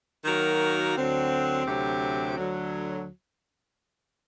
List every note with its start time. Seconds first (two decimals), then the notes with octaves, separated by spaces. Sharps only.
0.25 D#3 F#3 A#3 F#4 A#4
0.95 D2 D3 F#3 C4
1.66 D2 C3 F#3 C4 G4
2.36 D2 D3 F#3